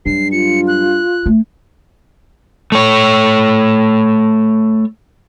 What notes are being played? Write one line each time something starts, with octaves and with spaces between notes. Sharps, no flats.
G2 F#3 C7
F4 C#7
F#6
A3
A3 C#5